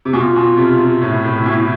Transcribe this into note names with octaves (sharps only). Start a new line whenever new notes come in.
C3
B2 F4
B2
C3
C3
A2 E4
A2
B2